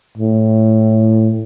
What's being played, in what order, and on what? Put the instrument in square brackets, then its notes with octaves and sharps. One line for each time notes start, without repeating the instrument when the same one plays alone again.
[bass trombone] A2